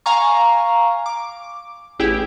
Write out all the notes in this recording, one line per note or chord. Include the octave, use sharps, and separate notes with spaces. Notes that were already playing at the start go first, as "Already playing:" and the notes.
F5 G#5 A#5 C#6
D6
A1 E4 G4 G#4 G5